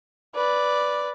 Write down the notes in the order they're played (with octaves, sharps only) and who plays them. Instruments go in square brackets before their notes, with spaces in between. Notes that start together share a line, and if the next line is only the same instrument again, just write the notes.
[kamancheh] B4 D5